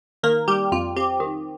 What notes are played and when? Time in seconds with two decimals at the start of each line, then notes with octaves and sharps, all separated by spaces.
0.23 D#3 A#3 A#4
0.48 G3 G4
0.72 F2 F4
0.96 C4 G4
1.20 D#3